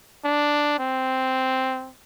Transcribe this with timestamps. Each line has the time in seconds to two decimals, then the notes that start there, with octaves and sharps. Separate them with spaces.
0.24 D4
0.79 C4